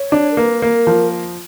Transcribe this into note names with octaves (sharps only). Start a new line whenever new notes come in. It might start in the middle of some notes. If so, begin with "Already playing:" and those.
Already playing: C#5
D4
A#4
A#3 B4
A#3
A#4
F3